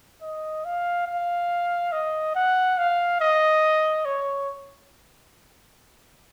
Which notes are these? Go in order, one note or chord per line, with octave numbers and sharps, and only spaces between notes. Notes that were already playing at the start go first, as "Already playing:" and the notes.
D#5
F5
F5
D#5
F#5
F5
D#5
C#5